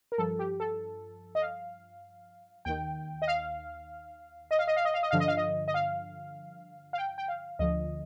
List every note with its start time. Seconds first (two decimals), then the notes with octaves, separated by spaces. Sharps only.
0.12 A#4
0.18 G2 F3 A4
0.39 G4
0.60 A4
1.35 D#5
1.42 F5
2.65 D#2 D#3 G5
3.22 D#5
3.28 F5
4.51 D#5
4.59 F5
4.68 D#5
4.76 F5
4.85 D#5
4.94 F5
5.03 D#5
5.11 G2 D3 F3 F5
5.20 D#5
5.28 F5
5.37 D#5
5.68 D#5
5.74 F5
6.93 F5
6.98 G5
7.18 G5
7.28 F5
7.59 D2 D3 F3 D#5